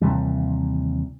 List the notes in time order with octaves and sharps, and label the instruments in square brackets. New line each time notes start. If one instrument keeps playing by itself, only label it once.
[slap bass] D#2 C3 E3 G3